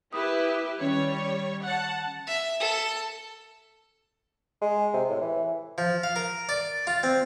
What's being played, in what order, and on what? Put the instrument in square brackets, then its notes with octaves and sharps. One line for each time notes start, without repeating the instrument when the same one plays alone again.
[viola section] E4 G4 B4 [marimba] D#6
[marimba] D#3 C#4 [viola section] G3 C#5
[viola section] F#5 A5
[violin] E5
A4
[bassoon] G#3
C3
A2
E3
[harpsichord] F3
F5
A#4
D5
F4
C4